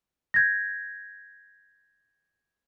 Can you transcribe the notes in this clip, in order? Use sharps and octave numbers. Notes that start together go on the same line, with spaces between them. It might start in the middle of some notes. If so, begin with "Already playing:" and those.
G6 G#6 A#6